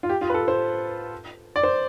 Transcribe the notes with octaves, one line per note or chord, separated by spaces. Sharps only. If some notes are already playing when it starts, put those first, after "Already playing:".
F4
G4
F4
B4
A4
C5
D5
C5